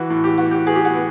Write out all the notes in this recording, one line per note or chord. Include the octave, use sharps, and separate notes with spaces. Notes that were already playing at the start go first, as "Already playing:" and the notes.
Already playing: E3 F#4
A2
G4
B3 F#4
G4
B3 G#4
G4
F#4 G#4
B3